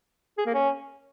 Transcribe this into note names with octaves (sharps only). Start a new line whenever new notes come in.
G#4
A#3
C#4